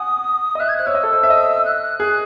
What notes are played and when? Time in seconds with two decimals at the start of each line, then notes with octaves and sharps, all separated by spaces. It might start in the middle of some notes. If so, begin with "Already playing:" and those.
Already playing: F#5 G#5 D#6
0.55 D#5
0.59 E5 F#6
0.69 G#6
0.77 C5 F#6
0.86 C#5 E6
0.95 D#5
1.04 A4
1.13 C5
1.23 E5
1.30 D#5
1.65 F#6
1.83 F#6
2.00 G#4 F#6